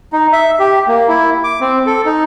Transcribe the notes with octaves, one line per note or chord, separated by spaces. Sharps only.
D#4
E5
G4
A#3
E4
D6
C4
A4
D#4